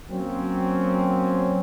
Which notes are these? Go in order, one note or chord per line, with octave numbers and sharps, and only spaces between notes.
F#3 A#3 C4 C#4